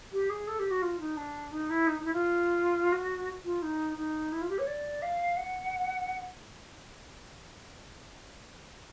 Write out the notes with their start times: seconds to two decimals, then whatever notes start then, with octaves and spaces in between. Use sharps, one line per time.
0.13 G4
0.30 G#4
0.47 A4
0.59 G4
0.71 F#4
0.82 F4
1.00 D#4
1.17 D4
1.52 D#4
1.70 E4
1.87 D#4
2.00 D#4
2.05 E4
2.13 F4
2.92 F#4
3.45 F4
3.62 D#4
3.97 D#4
4.32 E4
4.41 F4
4.50 G4
4.59 C#5
4.67 D5
5.02 F5
5.37 F#5